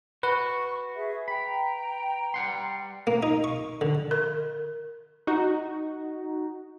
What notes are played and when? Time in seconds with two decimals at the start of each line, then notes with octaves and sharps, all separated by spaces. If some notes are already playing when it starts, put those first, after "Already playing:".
0.23 F#4 B4 C#6
0.96 G#4 E5
1.28 G5 A#5 B5
2.34 G3 F#5 C6
3.07 A#3
3.23 D#4
3.44 C#6
3.81 D3
4.11 A#4
5.27 D#4 F#4